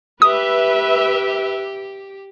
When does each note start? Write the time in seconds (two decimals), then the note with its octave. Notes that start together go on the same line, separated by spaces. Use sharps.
0.22 G4 B4 E5 D#6